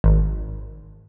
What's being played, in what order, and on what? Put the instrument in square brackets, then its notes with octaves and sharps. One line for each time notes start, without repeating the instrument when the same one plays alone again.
[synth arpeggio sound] G#1